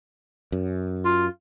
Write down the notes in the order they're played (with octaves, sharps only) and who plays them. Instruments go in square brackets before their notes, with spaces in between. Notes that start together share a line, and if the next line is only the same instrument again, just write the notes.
[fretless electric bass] F#2
[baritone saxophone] F4